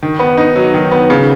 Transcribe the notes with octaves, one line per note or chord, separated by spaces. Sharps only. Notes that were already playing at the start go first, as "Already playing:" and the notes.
D#3
B3
D#4
F#3
D#3
B3
C#3